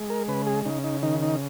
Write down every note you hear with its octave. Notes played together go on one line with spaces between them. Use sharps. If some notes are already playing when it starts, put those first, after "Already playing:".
Already playing: G#3
A#4
C#3 B4
G#4
C#3 D#4
D#4
D#3 D#4
D#4